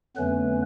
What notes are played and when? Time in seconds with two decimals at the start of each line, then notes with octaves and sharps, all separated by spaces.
0.16 F2 D3 F#3 A3 B3 C#4 B4